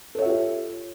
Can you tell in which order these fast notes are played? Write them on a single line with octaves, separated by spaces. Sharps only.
A4 C#5 E5 F4 G4